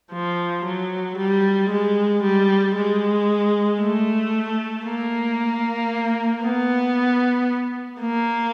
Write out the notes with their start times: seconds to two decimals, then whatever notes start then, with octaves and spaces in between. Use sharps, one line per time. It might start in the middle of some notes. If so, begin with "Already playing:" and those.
0.12 F3
0.65 F#3
1.17 G3
1.70 G#3
2.23 G3
2.75 G#3
3.80 A3
4.85 A#3
6.43 B3
8.01 A#3